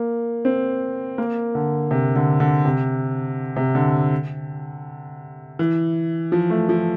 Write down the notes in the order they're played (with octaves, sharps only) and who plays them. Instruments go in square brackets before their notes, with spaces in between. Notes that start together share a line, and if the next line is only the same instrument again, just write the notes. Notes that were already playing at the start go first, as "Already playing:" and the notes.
Already playing: [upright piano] A#3
C4
A#3
D3
C3
D3
D3
C3
C3
D3
E3
F3
A3
F3